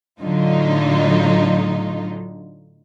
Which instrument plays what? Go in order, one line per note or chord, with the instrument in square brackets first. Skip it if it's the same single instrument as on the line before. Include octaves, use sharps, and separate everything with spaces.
[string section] A2 D3 F#3 D#4 F4